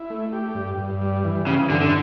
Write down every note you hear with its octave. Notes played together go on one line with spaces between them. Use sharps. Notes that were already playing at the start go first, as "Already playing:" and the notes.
Already playing: E4
A3
G4
G2
G2
G3
E3
C#3 E3
G2 D3
D3